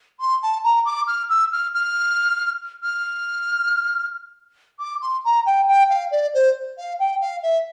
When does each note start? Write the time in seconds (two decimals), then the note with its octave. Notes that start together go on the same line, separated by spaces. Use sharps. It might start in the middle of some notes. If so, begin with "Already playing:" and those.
0.20 C6
0.42 A5
0.64 A#5
0.85 D6
1.07 F6
1.29 E6
1.52 F6
1.73 F6
2.83 F6
4.79 D6
5.01 C6
5.24 A#5
5.46 G5
5.67 G5
5.89 F5
6.11 D5
6.34 C5
6.77 F5
6.99 G5
7.20 F5
7.42 E5